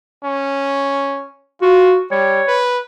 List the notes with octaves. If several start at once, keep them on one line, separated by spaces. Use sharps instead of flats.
C#4
F4 F#4
G3 C#5
B4